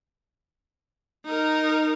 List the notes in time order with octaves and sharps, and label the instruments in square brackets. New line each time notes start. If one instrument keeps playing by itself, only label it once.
[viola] D#4 A#4